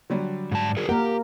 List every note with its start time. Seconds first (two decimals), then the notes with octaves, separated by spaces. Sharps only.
0.10 D3 F#3 G3
0.52 G#2 A5
0.77 F#4 G#4 A#4
0.89 A#3 G4 A#4 F#5